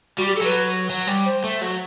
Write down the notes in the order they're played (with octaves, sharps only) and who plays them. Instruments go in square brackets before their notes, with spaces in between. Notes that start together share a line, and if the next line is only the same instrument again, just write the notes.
[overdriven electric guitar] G3 [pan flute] F#4
[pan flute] G4
A4
[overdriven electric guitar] F#3 [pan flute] B4
[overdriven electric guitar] F#3
G3
[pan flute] C5
[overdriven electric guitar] A3
F#3